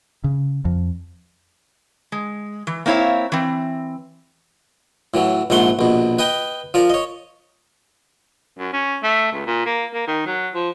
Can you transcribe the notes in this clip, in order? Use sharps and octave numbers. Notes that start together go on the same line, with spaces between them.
C#3
F2
G#3
E3
A#3 C4 E4 C#5 F5
E3 C4
A2 E3 F#3
A#1 G#2 A3 F#5 C6
A#1 B2
B4 D#5 G5 D#6
F3 A#4 D5
C#5 D#5
F#2
C#4
A3
C#2
A#2
A#3
A#3
D#3
F#3
F3